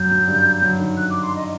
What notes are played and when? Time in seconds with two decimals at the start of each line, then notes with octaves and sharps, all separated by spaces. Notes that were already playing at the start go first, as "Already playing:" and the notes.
Already playing: F#2 F#3 G6
0.11 F#2 F#3
0.28 G2 G3
0.62 F#2 F#3
0.80 D#3
0.97 F#6
1.10 D6
1.23 C6
1.36 D#5